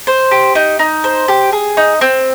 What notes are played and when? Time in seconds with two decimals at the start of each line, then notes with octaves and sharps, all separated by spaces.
0.07 C5
0.31 G4
0.55 D#4
0.79 D#4
1.04 C5
1.28 G4
1.53 G#4
1.77 D#4
2.01 C4